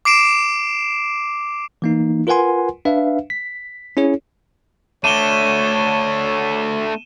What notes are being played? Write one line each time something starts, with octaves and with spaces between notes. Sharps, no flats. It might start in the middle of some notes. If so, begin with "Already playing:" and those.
D6 C7 D7 E7
E3 A#3 D#4
F4 A#4 B4 F#5 G#5 C6
D4 B4 E5 F5
B6
C#4 E4 G#4 C#5
A3 D4 C#5 D#7 E7 G7